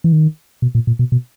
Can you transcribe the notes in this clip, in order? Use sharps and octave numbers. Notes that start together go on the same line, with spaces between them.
E3
D#3
B2
A#2
A#2
B2
B2